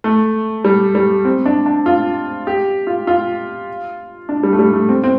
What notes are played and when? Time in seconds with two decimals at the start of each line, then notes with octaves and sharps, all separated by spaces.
0.04 A3
0.65 G3
0.95 G3
1.25 C4
1.46 D4
1.66 D4
1.86 F4
2.47 G4
2.87 F4
3.07 F4
4.29 D4
4.43 G3
4.53 A3
4.59 G3
4.74 A3
4.89 C4
5.04 C4